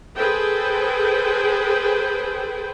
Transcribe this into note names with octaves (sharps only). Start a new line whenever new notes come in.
G#4 A4 B4 C5 G5